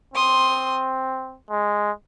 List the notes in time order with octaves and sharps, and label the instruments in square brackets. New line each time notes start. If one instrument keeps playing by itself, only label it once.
[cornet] C4 [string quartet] C6 D#6
[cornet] G#3